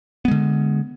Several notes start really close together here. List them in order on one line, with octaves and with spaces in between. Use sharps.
B3 G#3 D3